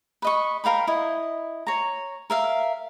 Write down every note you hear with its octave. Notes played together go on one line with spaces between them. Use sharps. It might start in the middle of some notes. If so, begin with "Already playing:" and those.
B4 D#5 C#6
A#4 F5 G5 B5
E4 D#5
C#5 A#5
A#4 E5 F5